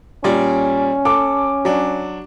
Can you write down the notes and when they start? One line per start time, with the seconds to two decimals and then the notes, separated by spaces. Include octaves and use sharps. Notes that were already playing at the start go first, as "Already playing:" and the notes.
0.24 A#2 G3 C#4 D5
1.05 A4 D6
1.65 F#3 D4